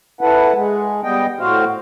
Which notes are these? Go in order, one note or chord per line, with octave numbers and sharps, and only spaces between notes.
E4 A4 B4 F#5
G#3
G3 B3 D#5 G5
A2 F#4 C5 F5